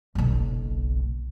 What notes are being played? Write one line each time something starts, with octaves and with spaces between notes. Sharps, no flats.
F#1 B1